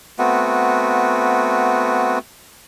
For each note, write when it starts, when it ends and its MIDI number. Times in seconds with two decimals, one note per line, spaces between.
0.19 2.19 57
0.19 2.19 59
0.19 2.19 60
0.19 2.19 66